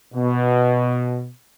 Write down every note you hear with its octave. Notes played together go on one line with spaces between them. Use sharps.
B2